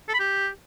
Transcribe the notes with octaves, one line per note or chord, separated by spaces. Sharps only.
A4
B5
G4